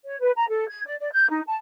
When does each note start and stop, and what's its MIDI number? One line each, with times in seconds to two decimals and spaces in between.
0.05 0.18 73
0.20 0.31 71
0.36 0.48 82
0.49 0.66 69
0.68 0.82 92
0.86 0.95 74
1.00 1.10 74
1.12 1.30 91
1.30 1.41 63
1.47 1.56 81